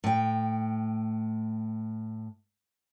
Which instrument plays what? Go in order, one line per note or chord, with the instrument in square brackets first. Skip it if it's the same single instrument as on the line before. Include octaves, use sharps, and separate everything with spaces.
[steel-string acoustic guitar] A2 G5